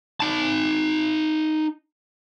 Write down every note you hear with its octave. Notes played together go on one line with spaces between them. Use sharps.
D#4 A5